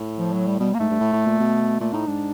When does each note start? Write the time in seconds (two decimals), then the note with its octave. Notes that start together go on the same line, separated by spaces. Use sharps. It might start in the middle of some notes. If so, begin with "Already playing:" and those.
Already playing: A2
0.19 F3
0.33 F#3
0.47 G3
0.59 B2 G3
0.74 A#3
0.80 G#2 A3
0.90 G2
1.00 A2
1.13 A2
1.26 A#2
1.40 B2
1.81 A#2 A3
1.94 A2 D#4
2.08 G#2 D4